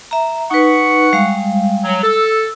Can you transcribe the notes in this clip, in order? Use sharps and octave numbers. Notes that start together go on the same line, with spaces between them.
E5 A#5
D#4 B4 F#5 C#6
G3 G#3 F5
F#3
A4 E6